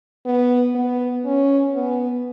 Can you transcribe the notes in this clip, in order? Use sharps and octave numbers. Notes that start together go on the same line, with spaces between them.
B3
B3
C#4
B3